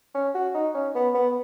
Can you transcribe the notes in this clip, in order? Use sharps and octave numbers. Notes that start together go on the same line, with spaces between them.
C#4
F#4
D#4
C#4
B3
B3